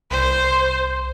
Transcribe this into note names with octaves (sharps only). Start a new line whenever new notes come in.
C2 C5